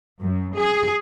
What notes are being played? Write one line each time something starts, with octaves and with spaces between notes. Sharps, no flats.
F#2
G#4